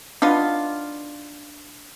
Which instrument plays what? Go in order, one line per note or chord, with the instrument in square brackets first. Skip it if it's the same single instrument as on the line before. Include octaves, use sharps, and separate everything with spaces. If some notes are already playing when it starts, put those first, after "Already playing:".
[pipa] B3 D#4 F4 [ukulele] D4